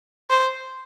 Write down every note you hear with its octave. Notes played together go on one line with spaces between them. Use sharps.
C5